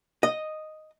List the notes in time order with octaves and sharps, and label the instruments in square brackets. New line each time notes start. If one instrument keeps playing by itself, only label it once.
[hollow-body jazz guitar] D#5